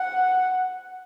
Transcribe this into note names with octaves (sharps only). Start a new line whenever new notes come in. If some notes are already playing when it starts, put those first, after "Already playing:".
Already playing: F#5